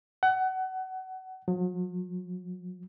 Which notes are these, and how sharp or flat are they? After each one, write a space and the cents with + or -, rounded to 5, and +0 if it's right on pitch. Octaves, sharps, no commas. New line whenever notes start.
F#5 +25
F#3 -45